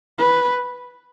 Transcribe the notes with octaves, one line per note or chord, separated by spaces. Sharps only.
B4